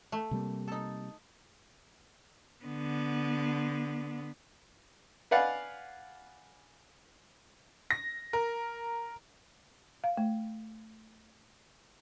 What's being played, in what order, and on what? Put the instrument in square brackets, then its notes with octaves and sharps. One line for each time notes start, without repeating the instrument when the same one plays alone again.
[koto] A3
[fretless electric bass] C3 G3 A#3
[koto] D#4 A4
[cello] D3 B3
[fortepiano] B4 D5 F5 F#5 G#5
[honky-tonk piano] A#6
A#4
[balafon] F5
A3